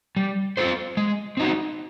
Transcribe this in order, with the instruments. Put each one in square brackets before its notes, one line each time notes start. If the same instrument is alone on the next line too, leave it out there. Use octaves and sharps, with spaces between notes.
[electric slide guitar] G3
C4 F4 A4 C5
G#3
C4 D#4 F#4